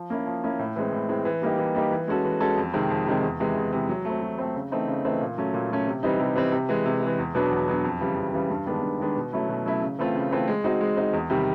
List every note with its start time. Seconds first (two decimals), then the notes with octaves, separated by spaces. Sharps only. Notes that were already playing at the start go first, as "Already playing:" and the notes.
Already playing: F3
0.10 A#3 C#4 E4
0.26 F3
0.43 A#3 C#4 E4
0.59 A2
0.76 E3 G#3 C4
0.93 A2
1.09 E3 G#3 C4
1.25 E3
1.42 G3 A#3 D#4 G4
1.58 E3
1.75 G3 A#3 D#4 G4
1.91 E3
2.08 G#3 C#4 F#4 A4
2.25 E3
2.40 G#3 C#4 F#4 A4
2.57 F2
2.73 C3 D#3 G#3 C4
2.90 F2
3.06 C3 D#3 G#3 C4
3.23 E2
3.40 C3 E3 G#3
3.56 E2
3.73 C3 E3 G#3
3.89 F#3
4.05 A3 C4
4.22 F#3
4.38 A3 C4
4.55 C#3
4.71 E3 A3 C4 D#4
4.87 C#3
5.05 E3 A3 C4 D#4
5.21 A#2
5.38 F#3 A3 C#4
5.54 A#2
5.71 F#3 A3 C#4
5.87 C3
6.03 E3 G3 C4 D#4
6.19 C3
6.35 E3 G3 C4 D#4
6.52 C3
6.69 E3 G#3
6.86 C3
7.02 E3 G#3
7.19 E2
7.35 B2 F#3 B3 D4
7.51 E2
7.68 B2 F#3 B3 D4
7.84 F2
8.01 C#3 E3 G3
8.17 F2
8.34 C#3 E3 G3
8.50 G2
8.66 D#3 G#3 B3 D4
8.82 G2
9.00 D#3 G#3 B3 D4
9.16 B2
9.33 F#3 A3 C#4 E4
9.48 B2
9.65 F#3 A3 C#4 E4
9.82 C#3
9.99 E3 A3 C4 F4
10.15 C#3
10.31 E3 A3 C4 F4
10.48 G#3
10.64 C4 D#4 F#4
10.81 G#3
10.97 C4 D#4 F#4
11.13 E2
11.30 C3 D#3 G3